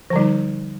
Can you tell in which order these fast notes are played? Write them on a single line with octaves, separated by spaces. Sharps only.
F3 D3 G3 D#4